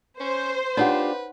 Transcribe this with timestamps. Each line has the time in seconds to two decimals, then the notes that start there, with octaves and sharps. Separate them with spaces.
0.20 C#4 C5
0.77 D4 D#4 F4 G4 B4 C#5 F#5